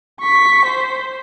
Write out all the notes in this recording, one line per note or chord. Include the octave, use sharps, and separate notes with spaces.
C#6 B6
C5